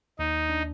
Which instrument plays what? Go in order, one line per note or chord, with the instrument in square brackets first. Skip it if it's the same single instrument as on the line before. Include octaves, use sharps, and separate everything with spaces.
[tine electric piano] D#2 [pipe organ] D#4
[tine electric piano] D4